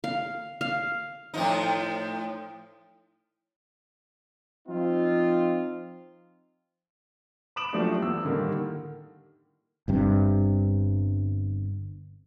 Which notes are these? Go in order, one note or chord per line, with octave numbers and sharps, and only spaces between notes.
F5
F5
A2 F3 D#4
F3 C4 D#4 F4
B5 D6 D#6 D7 E7 F#7
F3 F#3 A3 C#4 D4 G4
E2 E6
A2 D3 D#3 G3 A#3
G1 G2 C3